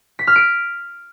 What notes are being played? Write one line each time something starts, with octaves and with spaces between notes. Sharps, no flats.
B6
F6
D7